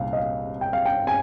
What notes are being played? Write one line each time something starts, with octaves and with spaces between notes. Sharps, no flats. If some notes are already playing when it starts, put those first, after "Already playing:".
Already playing: C2 A#2 F5
D#5
F5
G5
F5
G5
G#5